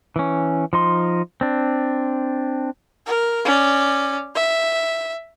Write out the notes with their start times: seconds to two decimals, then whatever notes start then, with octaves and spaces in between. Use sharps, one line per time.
0.16 E3 C#4
0.73 F3 D#4 C6
1.41 C4 D4
3.06 A#4
3.45 C#4 D5
4.35 E5